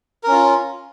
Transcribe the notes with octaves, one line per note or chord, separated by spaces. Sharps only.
C#4 F4 A#4